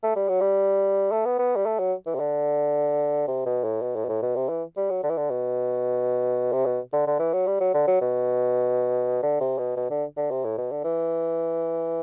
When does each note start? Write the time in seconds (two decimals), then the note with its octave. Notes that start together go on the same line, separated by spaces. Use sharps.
0.03 A3
0.16 G3
0.29 F#3
0.41 G3
1.12 A3
1.25 B3
1.39 B3
1.56 G3
1.66 A3
1.79 F#3
2.06 E3
2.15 C3
2.20 D3
3.27 C3
3.46 B2
3.64 A2
3.82 B2
3.96 A2
4.05 B2
4.09 A2
4.22 B2
4.36 C3
4.49 E3
4.77 G3
4.90 F#3
5.03 D3
5.10 E3
5.17 D3
5.31 B2
6.52 C3
6.66 B2
6.93 D3
7.07 D3
7.19 E3
7.33 F#3
7.47 G3
7.61 F#3
7.74 D3
7.87 F#3
8.01 B2
9.23 D3
9.40 C3
9.59 B2
9.77 B2
9.90 D3
10.17 D3
10.31 C3
10.44 A2
10.58 B2
10.72 D3
10.84 E3